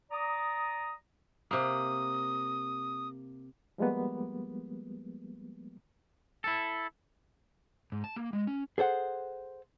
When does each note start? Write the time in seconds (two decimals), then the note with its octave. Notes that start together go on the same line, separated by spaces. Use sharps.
0.11 D5 A#5 D#6
1.51 C3 A#3 D#6
3.78 F3 G3 G#3 A#3 B3
6.44 E4 A4
7.92 G#2
8.04 A5
8.16 A#3
8.33 G#3
8.47 C#4
8.78 G#4 A4 C5 F#5